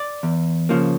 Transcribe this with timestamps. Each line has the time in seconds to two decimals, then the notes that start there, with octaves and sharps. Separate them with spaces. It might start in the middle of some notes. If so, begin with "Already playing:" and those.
Already playing: D5
0.23 E2
0.69 C#3 F3 A#3